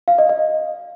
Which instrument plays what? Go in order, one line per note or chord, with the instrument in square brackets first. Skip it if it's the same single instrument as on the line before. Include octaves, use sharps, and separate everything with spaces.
[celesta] F5
D#5
D#5